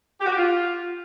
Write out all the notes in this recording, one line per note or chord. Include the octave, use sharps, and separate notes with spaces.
G4
F#4
G4
F4